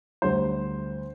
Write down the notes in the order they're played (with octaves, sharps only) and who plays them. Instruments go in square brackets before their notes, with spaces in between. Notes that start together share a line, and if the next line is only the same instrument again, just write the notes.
[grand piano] D2 D3 G3 C5